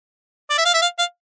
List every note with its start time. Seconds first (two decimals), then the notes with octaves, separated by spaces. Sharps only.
0.50 D5
0.58 E5
0.65 F5
0.74 E5
0.82 F5
0.99 F5